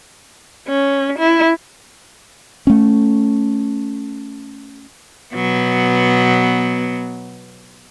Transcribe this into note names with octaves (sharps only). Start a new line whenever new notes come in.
C#4
E4
A3 C#4
B2 F#3 B3